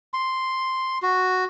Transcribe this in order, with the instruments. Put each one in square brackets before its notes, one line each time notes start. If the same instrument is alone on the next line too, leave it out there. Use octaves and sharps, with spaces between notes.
[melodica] C6
F#4